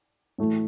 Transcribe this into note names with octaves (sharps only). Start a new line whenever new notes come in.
A2 E3 A3